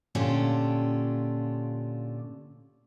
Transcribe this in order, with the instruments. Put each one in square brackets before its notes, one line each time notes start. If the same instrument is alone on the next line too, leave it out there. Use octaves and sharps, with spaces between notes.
[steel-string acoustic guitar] A#2 D3 C#4 D4 F4 G4